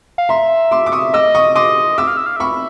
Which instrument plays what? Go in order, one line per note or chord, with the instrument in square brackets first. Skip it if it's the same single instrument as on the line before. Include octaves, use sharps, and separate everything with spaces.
[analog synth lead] F5
[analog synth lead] E5 [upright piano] A#5 C6
[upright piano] C6 D6
D6
C#6 D#6
[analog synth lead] D#5 [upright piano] D6 E6
[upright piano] C#6 D#6
[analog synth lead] D#5 [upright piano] C6 D6
[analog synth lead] E5 [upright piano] D6 E6
[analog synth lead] F5
E5
F5
[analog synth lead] E5 [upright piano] B5 C#6